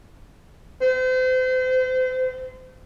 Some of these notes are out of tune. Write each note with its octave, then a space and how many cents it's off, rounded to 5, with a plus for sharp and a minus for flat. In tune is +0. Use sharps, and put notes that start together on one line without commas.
C5 -35